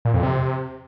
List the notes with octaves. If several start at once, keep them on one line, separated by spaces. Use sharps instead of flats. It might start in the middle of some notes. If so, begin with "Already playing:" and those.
A#2
F2
C3